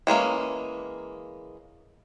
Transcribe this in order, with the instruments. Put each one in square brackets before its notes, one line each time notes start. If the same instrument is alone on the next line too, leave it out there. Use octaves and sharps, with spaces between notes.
[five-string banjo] E3 G#3 A#3 C#4